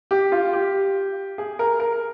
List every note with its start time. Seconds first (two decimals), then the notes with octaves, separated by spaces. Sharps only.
0.11 G4
0.32 F4
0.53 G4
1.38 G#4
1.59 A#4
1.80 A#4